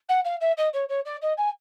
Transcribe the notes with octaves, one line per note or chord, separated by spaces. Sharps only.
F#5
F5
E5
D#5
C#5
C#5
D5
D#5
G#5